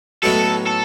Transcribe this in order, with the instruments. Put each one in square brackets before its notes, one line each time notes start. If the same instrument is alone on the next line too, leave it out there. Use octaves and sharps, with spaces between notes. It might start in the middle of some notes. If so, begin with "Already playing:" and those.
[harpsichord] A2 F#3 B3 D#4 F#4 [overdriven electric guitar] A4
[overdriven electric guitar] A4